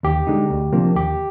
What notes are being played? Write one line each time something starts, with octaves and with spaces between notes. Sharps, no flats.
D#2 G4
D3 G#3 D#4
D2
C3 F3 A#3 D4
D#2 G4